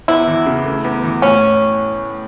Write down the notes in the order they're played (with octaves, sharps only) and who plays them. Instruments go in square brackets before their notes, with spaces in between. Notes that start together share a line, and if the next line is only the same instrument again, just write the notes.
[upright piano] E2 [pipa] E4
[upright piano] E3
C#3
A3
E2
E3
[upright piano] A2 [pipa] C#4